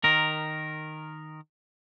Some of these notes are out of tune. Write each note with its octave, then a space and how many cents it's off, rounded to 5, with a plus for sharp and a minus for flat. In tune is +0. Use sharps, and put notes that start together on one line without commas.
D#3 -10 A#4 +0